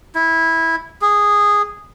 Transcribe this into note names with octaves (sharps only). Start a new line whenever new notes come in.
E4
G#4